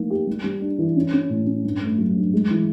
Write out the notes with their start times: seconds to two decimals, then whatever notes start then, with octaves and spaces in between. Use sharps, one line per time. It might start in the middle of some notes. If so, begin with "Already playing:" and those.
Already playing: F3 A3 A#3 D#4
0.10 G4
0.27 G3
0.44 G3
0.62 D4
0.79 E3
0.96 C#4
1.14 C#4
1.30 A2
1.47 C#4
1.65 G2
1.81 A3
1.98 F#3
2.16 G2
2.33 G#3
2.50 E3